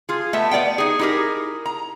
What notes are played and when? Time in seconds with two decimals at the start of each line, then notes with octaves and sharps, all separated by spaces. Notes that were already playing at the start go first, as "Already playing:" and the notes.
0.09 F4 G#4
0.33 A3 B3 E5 A5
0.51 B3 D5 F#5 G5
0.78 D#4 G#4
0.99 D#4 E4 G4 G#4 A#4
1.66 A#5